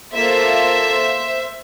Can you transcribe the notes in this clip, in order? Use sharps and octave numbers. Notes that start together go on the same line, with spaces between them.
A#3 F4 A4 C5 E5